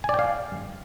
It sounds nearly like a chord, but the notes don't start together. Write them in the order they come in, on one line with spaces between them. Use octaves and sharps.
G#5 D5 G5 F5